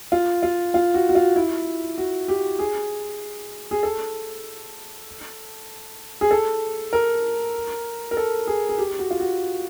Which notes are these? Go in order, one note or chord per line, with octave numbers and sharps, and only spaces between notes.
F4
F4
F4
F#4
F#4
F4
E4
F#4
G4
G#4
G#4
A4
G#4
A4
A#4
A#4
A4
G#4
G#4
G4
F#4
F4
F#4